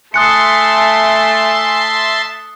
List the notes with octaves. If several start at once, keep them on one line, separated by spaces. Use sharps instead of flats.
A3 E5 G#5 A5 C6 D#6 F#6 C#7